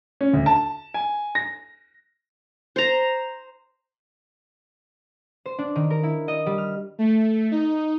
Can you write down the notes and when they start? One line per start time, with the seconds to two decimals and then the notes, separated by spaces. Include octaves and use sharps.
0.21 C#4
0.33 D2
0.46 A5
0.94 G#5
1.35 A#6
2.76 C5 A#5
5.46 C5
5.59 D4
5.76 D#3
5.90 A#4
6.03 E4
6.28 D#5
6.46 G3
6.58 F6
6.98 A3
7.51 D#4